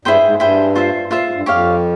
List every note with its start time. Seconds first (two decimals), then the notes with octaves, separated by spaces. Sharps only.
0.05 G2 E4 G#4 C5 G5
0.23 G#2
0.40 G2 E4 G#4 C5 G5
0.76 F4 C5 E5
1.11 A#2 F4 C5 E5
1.23 G#2
1.34 G2
1.46 F2 G4 C#5 F5